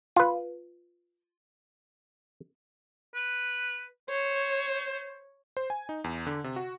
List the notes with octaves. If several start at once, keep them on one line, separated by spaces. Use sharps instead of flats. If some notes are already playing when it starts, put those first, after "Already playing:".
F4 B4
B4
C5 C#5
C5
G#5
D#4
E2
D3
C3
F#4